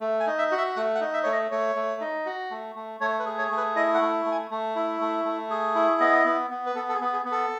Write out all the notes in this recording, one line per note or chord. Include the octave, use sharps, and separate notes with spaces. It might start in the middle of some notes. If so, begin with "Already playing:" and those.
A3
G#5
D#4
E5
F#4
E5
A3 F#5
F#5
D#4
E5
A3 C#5
D#5
A3 C#5
A3
D#4
F#4
A3
A3
A3 C#5
B4
G#4
C#5
A3
B4
E4 D#5
F#5
A3
A3
G#5
A3
E4
A3
A3
G#4
E4
B3 D#5
B3
B3
B4
B3 A4
A4
G#4
B3
G#4
B3
A4